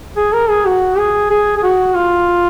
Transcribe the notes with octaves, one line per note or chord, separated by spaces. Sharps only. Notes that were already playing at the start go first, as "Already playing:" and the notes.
G#4
A#4
G#4
F#4
G#4
G#4
G#4
F#4
F4